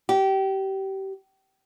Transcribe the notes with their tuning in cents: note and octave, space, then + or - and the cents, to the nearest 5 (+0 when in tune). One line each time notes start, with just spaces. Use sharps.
G4 -25